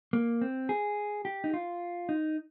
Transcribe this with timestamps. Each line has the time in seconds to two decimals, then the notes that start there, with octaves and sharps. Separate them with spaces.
0.13 A#3
0.41 C4
0.69 G#4
1.25 G4
1.44 D#4
1.54 F4
2.09 D#4